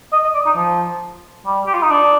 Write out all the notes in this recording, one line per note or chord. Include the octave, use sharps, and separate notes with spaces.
D#5
D#5
D5
D#4
F3
G3
G4
F4
D#4
D4